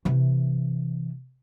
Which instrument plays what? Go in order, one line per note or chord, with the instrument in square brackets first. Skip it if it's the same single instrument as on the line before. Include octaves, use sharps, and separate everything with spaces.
[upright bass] C3 E3